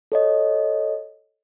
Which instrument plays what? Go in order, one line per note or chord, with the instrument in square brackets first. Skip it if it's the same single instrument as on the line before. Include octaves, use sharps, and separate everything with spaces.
[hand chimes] A4 C#5 D#5